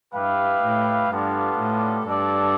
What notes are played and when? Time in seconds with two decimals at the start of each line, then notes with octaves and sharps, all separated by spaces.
0.13 G2 E4 G4 B4 F5
0.62 A2
1.10 G2 G3 B3 D4 F4 A4
1.58 A2
2.06 G2 D4 A4 D5